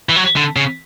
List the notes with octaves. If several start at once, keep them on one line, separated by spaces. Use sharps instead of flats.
E3
F#3
D3
C#3